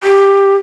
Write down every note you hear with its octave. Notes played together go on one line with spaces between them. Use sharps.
G4